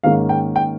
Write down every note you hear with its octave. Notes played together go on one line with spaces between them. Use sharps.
G#2 D#3 A#3 C#4 F5
G5
G5